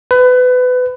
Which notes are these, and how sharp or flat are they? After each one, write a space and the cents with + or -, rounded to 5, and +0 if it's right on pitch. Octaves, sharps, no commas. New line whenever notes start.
B4 +25